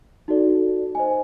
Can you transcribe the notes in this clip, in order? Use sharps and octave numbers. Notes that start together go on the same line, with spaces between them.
D#4 F#4 A4 D5
C5 D#5 G#5